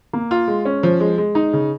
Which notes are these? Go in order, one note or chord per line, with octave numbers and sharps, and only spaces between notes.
A#3
F4
G#3
C#4
F3
G#3
G#3
D#4
C#3